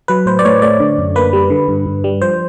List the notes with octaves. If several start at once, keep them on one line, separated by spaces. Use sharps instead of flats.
F#3 B4
A2 C5
D5
A2 C#5
A3 D5
D3
F#2
A#3 B4
G3
D3
G2
G2
G3
F3 C5